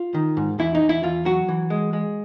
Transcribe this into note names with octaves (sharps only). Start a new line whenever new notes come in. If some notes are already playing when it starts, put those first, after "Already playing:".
Already playing: F4
D#3
G#2
E2 E4
D#4
E2
E4
E2 F4
F#3 F#4
E3
G#3
G#3